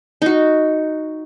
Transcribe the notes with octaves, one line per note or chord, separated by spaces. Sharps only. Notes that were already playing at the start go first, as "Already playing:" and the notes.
D#4 F#4